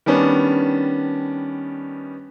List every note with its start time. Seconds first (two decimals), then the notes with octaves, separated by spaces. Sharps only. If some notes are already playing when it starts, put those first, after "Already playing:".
0.06 D#3 G3 B3 C#4 D4